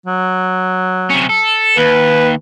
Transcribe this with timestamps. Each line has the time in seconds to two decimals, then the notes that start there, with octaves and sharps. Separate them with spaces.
0.06 F#3
1.10 C3 C#4
1.29 A4
1.77 D#2 B4